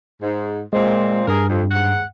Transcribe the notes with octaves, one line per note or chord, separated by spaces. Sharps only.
G#2
A#2 G#3 C4
G2 G#4 A#4
F2
D#2 G#2 F#5